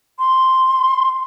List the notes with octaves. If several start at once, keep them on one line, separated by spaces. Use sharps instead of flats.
C6